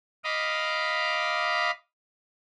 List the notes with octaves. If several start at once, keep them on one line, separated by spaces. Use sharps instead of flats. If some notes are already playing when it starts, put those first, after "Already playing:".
D#5 F5 B5 D6